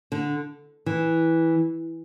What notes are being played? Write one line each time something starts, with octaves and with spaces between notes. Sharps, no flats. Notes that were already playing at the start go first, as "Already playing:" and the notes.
D3
E3